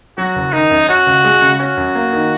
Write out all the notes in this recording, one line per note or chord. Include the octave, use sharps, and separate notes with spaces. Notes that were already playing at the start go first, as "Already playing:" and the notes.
F#3 F#4
F#1
D#3 D#4
F#2
C#4 F#4
C#2
G#3
C#3
C#4 F#4
F#2
A#3
D#3